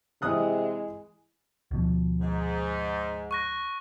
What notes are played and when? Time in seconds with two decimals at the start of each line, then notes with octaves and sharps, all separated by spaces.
0.22 C3 E3 G#3 D#6 F#6
1.71 D2 B2 F3
2.20 G#2
3.31 C#6 F#6 A#6